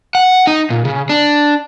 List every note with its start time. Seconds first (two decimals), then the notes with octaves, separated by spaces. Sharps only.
0.15 F#5
0.47 D#4
0.70 A#2
0.85 C#3
1.09 D4